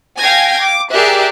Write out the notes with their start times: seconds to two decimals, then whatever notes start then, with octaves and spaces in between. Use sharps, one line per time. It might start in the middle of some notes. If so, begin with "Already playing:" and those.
0.19 F5 G5 G#5 G#6 A#6
0.61 D6
0.91 G4 G#4 A#4 D5 E5 F#6